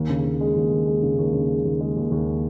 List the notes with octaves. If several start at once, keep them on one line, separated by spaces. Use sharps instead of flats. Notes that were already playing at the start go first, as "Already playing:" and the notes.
Already playing: D#2
C#3
C#3
G#3
D#2
D#2
G#3
C#3
D#2
C#3
G#3
D#2
G#3
D#2
D#2